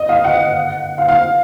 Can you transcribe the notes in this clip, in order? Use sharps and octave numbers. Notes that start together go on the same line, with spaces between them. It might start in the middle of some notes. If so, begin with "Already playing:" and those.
Already playing: D#5
F5
F#5
F5
F5